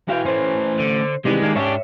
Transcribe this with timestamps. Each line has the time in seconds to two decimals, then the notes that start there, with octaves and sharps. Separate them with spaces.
0.09 E3 E4 F#4 F5 G5
0.26 A3 C#4 C5
0.80 D3
1.25 C3 D#3 E3 G3 G#3
1.42 D#3 A#3 D4
1.55 G#2 C#4 D4 G4 C#5 E5